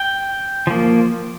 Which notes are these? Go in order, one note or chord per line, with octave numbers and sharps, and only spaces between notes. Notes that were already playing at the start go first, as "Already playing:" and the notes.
Already playing: G5
F3 A#3